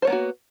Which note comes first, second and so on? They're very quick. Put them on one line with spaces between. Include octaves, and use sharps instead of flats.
C5 C#5 B3 A#3 F#4